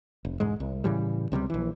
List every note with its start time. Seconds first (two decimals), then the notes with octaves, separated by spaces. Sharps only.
0.25 F1
0.40 E1 G#2 G#3
0.60 C2
0.84 A2 C#3 E3 G3
1.32 C#2 C3 F#3 G3
1.50 A#1 E3